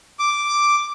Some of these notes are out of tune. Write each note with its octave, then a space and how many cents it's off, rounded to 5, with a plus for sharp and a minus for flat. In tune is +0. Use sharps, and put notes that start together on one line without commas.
D6 +0